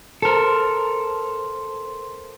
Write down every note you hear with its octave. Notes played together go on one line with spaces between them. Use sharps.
A4 A#4 C5 C6